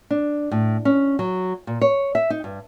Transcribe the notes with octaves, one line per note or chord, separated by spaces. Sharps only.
D4
A2
C#4
F#3
A#2
C#5
E5
D#4
G2